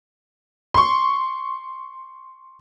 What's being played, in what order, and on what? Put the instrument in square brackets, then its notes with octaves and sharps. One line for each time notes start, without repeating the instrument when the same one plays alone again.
[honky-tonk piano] C6 C#6